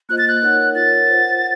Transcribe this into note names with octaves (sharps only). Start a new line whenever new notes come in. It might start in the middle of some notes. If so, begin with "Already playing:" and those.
A#3 F4 C5 D#5 F#6
A6
F#6
D#4 A#4 C#5 F#5
F4 A#4 C#5 F#5 A6
F4 C5 F#5